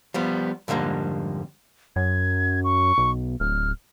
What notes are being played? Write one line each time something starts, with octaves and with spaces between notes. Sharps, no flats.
F3 G3 B3
F2 G#2 D3 G3 A#3
F#2 G#6
C#6
B1
D1 F6